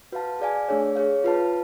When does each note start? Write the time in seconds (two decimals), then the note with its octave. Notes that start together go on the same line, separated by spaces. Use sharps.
0.12 F#4 B4 F5 A5
0.40 G#4 D5 F5 G#5
0.69 A3 D4 G#4 C#5
0.95 G#4 C#5 F5
1.24 F4 B4 F5 A5